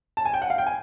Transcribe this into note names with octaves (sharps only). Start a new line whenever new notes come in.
A5
G#5
G5
F#5
F5
G5
G#5